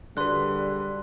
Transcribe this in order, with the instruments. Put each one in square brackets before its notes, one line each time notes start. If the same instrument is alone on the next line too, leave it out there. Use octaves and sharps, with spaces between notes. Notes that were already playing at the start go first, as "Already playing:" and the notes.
[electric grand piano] D3 B4 [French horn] G3 [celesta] F#4 G#4 D5 [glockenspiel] C6 F#6